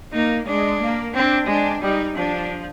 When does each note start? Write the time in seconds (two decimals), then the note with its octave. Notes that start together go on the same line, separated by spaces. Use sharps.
0.12 A#3 D#4
0.46 G#3 D4
0.80 A#3
1.14 C4 D4
1.47 G#3 D4
1.81 G3 D#4
2.15 F3 D4